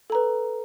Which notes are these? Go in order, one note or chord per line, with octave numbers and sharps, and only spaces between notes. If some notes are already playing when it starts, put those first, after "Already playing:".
A4 B4 A#5